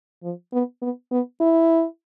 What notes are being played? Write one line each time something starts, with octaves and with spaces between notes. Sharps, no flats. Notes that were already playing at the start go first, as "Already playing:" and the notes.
F3
B3
B3
B3
E4